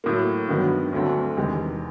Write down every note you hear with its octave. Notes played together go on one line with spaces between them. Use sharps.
A2 F#3 A#3
G2 D#3 F#3 B3
D2 D3 F#3 A3 C4
E2 C3 D#3 G#3